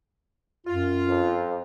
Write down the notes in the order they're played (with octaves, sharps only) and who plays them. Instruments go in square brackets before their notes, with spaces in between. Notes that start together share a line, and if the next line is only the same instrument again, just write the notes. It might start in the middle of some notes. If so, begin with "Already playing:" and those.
[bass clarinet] F#2 [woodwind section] F4
[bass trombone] F2